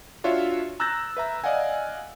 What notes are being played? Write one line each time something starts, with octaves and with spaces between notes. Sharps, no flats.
D4 F4 F#4 C#5 E5
A#5 E6 F#6 G6 A6 A#6
B4 E5 A#5
D5 D#5 F5 F#5 G#5